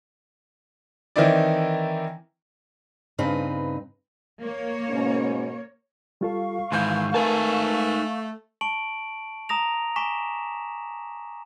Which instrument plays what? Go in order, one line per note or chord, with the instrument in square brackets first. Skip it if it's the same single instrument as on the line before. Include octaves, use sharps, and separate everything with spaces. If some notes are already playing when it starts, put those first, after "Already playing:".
[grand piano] D#3 E3 C4 D#4 E4 D5
[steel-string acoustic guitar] G2 C#3 C4 D#4 B4
[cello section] A#3 C#5
[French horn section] G#2 B2 C#4
[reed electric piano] G3 F4 A4 [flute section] F5 C#6
[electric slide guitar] G#2 D#3 [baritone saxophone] E3 [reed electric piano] C6 G6
[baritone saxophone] A3 [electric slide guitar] D#4 G#5 A5 [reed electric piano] A#4 B4
[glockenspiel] A5 C#6 D7 F#7
A#5 D#6 A#6 F7
G#5 C#6 D6 B6 E7